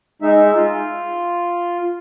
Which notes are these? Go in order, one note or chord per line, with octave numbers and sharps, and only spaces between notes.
G#3 D#4 E5
F4